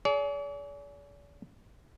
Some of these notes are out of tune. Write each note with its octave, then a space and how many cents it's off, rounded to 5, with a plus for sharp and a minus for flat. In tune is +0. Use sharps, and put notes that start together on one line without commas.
G#4 +30 D5 -45